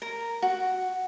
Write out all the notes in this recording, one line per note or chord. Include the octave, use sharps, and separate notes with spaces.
A#4
F#4